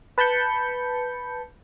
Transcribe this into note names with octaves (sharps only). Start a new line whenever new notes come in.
B4 A5 B5 G6 C#7